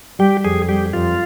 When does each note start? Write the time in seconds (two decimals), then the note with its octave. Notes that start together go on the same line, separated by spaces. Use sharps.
0.19 G3 G4
0.44 F2 G#4
0.68 G3 G4
0.93 F2 F4